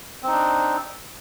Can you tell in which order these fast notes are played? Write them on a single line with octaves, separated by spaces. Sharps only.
C4 D#4 D4